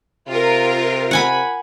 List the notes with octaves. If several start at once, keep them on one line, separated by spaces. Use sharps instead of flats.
C3 F4 A#4
F#5 G#5 B5